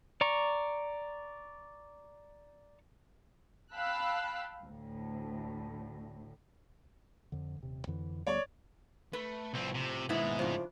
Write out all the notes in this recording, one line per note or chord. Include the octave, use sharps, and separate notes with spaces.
D5 A#5 C#6
F5 G5 A5 B5 E6 F#6
D2 A2
F2 D3
D#1 C3
F2 D3 E3
D2 G3 B3 C#5 D5
A3 B4
C2 A2 F3 C4
C3
D#2 G#2 B2 G#3 B3 E4
C#3 F3 D4